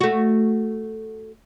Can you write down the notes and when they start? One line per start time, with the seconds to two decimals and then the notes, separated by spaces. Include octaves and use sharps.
0.01 A3 F#4